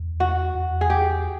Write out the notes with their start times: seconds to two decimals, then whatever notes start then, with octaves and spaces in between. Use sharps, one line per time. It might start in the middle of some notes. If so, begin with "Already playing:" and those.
Already playing: E2
0.20 F#4
0.55 E2
0.81 G#4
0.90 G4